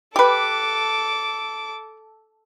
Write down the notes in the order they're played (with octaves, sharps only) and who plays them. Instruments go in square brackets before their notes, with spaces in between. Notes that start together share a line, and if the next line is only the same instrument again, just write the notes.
[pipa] G4 B4 [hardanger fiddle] A4 D6